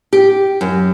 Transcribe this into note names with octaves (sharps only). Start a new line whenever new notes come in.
G4
F#2